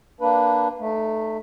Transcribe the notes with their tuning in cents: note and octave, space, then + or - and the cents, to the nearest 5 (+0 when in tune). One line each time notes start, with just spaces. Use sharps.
A#3 +0 D4 +0 B4 +0
A3 +0 D#4 -35